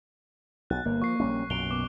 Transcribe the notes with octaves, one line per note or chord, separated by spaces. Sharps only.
B1 F#6 A6
G1 A#3
F3 C#6 C7
A#1 G3 C#4
B1 F#2 A#2 D7 F7 G7
B2 D6